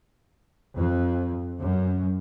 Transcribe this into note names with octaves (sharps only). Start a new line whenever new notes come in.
F2
F#2